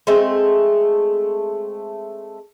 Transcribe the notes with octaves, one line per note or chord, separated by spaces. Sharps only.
G#3 A3 C4